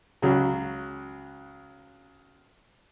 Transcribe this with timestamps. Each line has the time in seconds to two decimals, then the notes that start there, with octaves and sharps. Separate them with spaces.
0.22 C#2 F#3